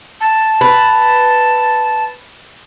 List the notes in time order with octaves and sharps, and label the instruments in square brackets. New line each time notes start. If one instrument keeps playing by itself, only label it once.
[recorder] A5
[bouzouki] B4